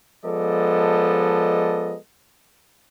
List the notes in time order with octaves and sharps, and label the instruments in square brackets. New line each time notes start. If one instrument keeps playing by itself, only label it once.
[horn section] F3 G#3 B3 A4 D5 D#5